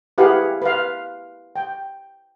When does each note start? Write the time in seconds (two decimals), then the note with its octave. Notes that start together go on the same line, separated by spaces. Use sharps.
0.18 E4 G4 G#4 B4 F5 F#5
0.62 B4 F5
1.56 G5